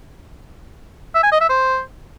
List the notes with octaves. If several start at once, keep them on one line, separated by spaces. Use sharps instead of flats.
E5
G#5
D#5
E5
C5